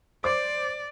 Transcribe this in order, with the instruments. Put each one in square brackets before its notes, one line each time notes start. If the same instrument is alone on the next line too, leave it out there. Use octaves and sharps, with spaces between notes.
[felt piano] C5 D6 [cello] D5